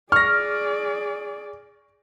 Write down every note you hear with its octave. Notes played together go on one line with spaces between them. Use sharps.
G#4 D5 C#6 F6 A#6